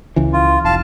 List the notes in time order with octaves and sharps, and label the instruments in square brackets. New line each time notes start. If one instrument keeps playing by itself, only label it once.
[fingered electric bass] C#2 C#3 E3
[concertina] F4
[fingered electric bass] F1 [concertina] F5 A5